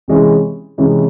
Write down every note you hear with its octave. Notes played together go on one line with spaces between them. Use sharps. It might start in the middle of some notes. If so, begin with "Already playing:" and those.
C3 E3 G#3 C#4 E4
C3 E3 G#3 C#4 E4